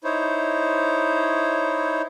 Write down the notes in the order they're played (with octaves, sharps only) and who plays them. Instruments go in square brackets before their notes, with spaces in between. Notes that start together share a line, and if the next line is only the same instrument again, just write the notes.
[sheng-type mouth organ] D#4 E4 C5 C#5